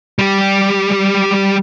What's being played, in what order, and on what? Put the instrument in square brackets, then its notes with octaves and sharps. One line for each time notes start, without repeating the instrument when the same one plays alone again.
[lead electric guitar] G3 G4